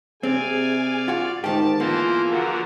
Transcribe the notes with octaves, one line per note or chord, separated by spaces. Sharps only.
C3 C4 G#4 D5 F5 G#5
F4 F#4
D2 G#2 D#3 G4 A5
E3 A#3 B3 F4 G#4 C5
D3 F3 F#3 A#3 F#4